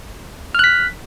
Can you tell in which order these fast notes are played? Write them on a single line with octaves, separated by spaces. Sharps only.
F6 F#6 B6